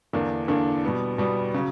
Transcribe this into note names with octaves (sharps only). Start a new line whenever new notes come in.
E2 D3 A#3 D4
E2 D3 A#3 D4
B2 G3 B3
B2 G3 B3
C#3 F#3